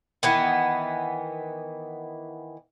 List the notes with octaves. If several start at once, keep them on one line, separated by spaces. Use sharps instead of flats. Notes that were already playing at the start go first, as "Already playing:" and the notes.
D#3 E3 B3